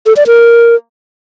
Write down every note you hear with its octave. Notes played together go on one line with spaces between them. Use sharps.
A4
D5
A#4